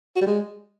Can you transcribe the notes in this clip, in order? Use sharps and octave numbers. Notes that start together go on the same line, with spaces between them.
F#4
G3
G#3